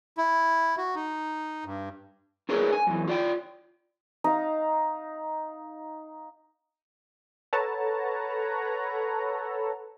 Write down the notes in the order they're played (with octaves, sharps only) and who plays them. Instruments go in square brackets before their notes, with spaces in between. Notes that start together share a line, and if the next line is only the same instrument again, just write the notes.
[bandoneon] E4
F#4
D#4
G2
[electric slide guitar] D4 G#4 A#4 B4 C#5
G#5
F#2 E3
F4 D5 G5
[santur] D#4 F5
[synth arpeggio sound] A4 B4 C#5 F#5 A5 A#5